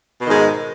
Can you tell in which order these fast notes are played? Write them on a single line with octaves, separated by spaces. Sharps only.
B2 D#3 G#2 G#3